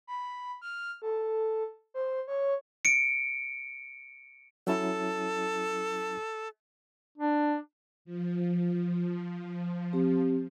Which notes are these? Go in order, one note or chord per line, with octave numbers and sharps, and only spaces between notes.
B5
F6
A4
C5
C#5
C#7 D7
F#3 C#4 E4 A4
D4
F3
C4 G4